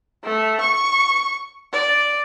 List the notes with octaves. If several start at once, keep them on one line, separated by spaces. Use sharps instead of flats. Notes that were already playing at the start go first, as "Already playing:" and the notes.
A3
C#6
D5